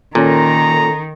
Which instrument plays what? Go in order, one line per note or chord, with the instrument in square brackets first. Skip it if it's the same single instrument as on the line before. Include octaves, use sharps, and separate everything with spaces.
[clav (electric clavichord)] A#2 [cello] D#3 [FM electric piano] C#4 A4 [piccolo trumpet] A#5